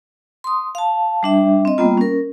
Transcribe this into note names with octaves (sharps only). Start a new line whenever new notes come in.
C6 D#6
F5 A5
G3 D4 E5
C4 D#5
G3 A#3 B3 F4
C#4 A#4